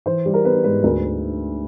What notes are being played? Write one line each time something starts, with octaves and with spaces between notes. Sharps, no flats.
E3 C5
G3
A#4
B3 B4
G#2 B4
D2 A#4